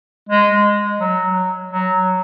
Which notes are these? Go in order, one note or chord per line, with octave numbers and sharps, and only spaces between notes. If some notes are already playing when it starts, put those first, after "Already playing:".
G#3
F#3
F#3